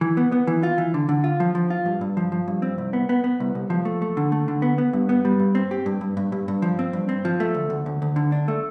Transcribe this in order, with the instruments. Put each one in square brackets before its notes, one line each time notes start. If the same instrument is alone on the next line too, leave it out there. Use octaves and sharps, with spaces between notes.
[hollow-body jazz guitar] E3
B3
B3
E3
F4
E3
D3
D3
F4
F3
F3
F4
G2
G2
F3
F3
G2
C4
C2
B3
B3
B3
C2
C2
F3
A3
A3
D3
A3
D3
B3
B3
G2
B3
G3
G2
C4
G4
G2
G2
G2
G2
G2
F3
C4
G2
C4
F3
A3
D2
D2
D2
D2
D3
D4
A3